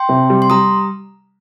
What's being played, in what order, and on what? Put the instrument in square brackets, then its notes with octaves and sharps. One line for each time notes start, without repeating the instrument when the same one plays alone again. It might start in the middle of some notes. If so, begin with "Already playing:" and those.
Already playing: [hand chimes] G5 C6
[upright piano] C3
G3
[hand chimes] C6
[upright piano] G3 [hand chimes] A#5 D#6